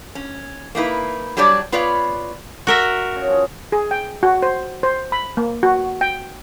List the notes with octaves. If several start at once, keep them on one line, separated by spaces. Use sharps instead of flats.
C#4
A#3 D#4 E4 B4
F#3 G3 D4 G4 C#5 D5
B3 F4 B4 C#5 D5
F#4 A#4 E5
C#3 C#6
F3 G#4
G#4
G5
F#4
C5
C5
B5
A#3
F#4
G5